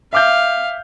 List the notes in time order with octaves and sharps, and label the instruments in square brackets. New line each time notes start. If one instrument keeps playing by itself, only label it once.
[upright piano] E5 D6 G6 [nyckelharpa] F5